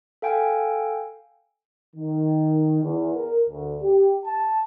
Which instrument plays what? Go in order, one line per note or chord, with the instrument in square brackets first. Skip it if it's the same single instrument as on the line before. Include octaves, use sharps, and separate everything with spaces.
[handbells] A4 F5 G5 G#5
[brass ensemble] D#3
E2
A#4
D2
G4
A5